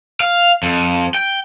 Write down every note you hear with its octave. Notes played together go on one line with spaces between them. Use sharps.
F5
F2
G5